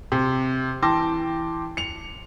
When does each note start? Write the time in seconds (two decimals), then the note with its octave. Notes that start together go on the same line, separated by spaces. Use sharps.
0.12 C3
0.82 E3 G5 A5 C6 D6 A#6
1.77 C#7 F7